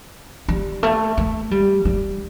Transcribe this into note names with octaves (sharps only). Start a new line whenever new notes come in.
G3
A3
A3
G3
G3